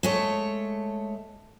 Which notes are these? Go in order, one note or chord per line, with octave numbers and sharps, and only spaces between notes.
G#3 A3 C#5